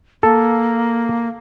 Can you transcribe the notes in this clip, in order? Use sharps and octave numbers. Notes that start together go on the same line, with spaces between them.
A#3 A4